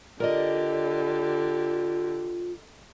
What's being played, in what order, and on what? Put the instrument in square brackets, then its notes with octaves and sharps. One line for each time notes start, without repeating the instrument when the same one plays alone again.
[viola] D3 G4 [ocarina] F4 [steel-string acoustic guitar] A#4 D5 D#5